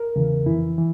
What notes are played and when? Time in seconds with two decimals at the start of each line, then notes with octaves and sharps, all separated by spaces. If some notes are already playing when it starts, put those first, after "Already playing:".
Already playing: A#4
0.16 E2 C#3 E3
0.46 F2 E3 E4
0.78 E3